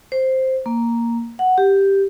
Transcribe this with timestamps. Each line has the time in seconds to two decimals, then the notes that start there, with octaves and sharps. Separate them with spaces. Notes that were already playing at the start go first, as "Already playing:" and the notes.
0.12 C5
0.66 A#3
1.39 F#5
1.58 G4